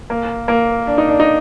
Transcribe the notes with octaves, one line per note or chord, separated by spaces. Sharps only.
A#3
A#3
D4
D#4
D4
D#4